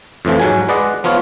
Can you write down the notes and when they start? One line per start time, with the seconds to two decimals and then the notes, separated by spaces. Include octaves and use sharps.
0.25 F2 A2 E3 F3
0.40 G#2 F#3 G#5
0.68 G#3 B4 D5 D#5 F#5
1.04 F3 B3 F4 C#5